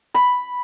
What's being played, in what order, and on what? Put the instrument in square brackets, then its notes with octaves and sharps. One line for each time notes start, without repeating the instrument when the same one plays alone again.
[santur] B5